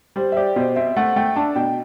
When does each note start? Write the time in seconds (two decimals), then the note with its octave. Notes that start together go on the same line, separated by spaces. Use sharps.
0.16 G3 C5
0.32 E5
0.37 G4 D5
0.56 B2 C5
0.76 C4 E5
0.96 A3 F#5
1.16 A3 G5
1.36 D4 A5
1.56 B2 G5